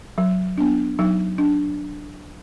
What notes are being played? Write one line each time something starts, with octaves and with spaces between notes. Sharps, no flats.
F#3
B3 D4
F#3 D#4
D4